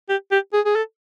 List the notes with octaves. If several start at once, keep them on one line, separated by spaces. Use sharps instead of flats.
G4
G4
G#4
G#4
A4